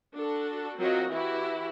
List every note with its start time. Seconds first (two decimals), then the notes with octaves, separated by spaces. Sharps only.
0.15 D4 F#4 A4
0.79 F#3 C4 F4 F#4 A#4 D#5
1.09 E3 E4 F#4 G4